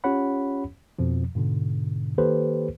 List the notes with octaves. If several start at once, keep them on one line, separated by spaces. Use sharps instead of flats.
C#4 F4 G4 C#5 F#5 B5
F2 B2 F3
G#2 B2 D3
D#3 A#3 G4 A4 B4 C5